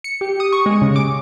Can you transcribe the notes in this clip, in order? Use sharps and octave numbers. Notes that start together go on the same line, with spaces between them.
C#7
G4
D#6
C#6
G#3
C#3
D6